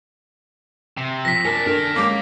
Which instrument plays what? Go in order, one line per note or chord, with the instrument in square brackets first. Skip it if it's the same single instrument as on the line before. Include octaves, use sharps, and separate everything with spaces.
[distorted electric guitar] C3
[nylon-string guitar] F3 [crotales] A#6 B6
[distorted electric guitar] C#4 D4 [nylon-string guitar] A#4
[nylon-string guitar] D4 A4 [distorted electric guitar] A#4 G5
[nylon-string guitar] G#3 C#4 [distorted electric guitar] A#3 [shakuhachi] D6